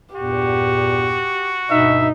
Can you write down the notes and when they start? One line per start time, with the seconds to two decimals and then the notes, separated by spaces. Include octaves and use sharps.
0.15 E2 G2 A#2 F#4 G4
1.70 D2 G2 B2 D#4 E5